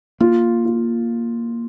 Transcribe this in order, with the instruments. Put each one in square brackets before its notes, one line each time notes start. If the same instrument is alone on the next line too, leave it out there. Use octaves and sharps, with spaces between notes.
[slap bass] A#3 [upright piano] F4
[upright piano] F4